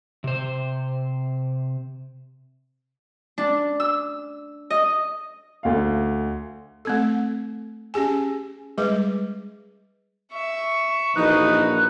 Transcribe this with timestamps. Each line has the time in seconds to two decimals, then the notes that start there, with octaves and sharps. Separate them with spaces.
0.24 C3 C5
3.38 D4
3.80 E6
4.70 D#5
5.63 D2 F5
6.85 A3 C4 A4
7.94 C#4 G4 G#4 G#5
8.78 G3 G#3 G#4 B4 D6
10.32 E5 C#6
11.16 A#1 E3 D#4 F#4 B4 F#6